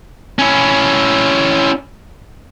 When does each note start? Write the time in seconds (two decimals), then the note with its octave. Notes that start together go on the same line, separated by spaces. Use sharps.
0.39 C#4 E4